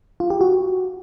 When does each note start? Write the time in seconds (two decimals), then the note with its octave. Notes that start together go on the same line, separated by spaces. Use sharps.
0.20 F4
0.30 G4
0.41 F#4